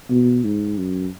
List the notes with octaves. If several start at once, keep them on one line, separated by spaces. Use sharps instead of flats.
B2
G#2
F#2